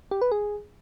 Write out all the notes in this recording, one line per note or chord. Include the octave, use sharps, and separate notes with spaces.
G4
B4
G#4